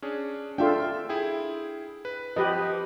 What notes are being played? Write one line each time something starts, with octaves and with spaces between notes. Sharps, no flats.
C#4 D4 G#4
D4 F4 A4 E5 G5
E4 G#4 G5
B4
F3 G4 B4 D#5